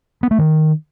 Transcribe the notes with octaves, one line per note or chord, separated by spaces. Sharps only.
B3
A3
D#3